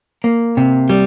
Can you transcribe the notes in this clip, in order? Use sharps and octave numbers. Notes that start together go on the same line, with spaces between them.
A#3
C3
G3